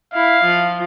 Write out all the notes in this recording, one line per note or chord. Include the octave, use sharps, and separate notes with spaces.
E4 F5
F3